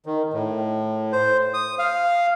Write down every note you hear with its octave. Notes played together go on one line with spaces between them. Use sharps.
D#3
A2
C5
D#6
F5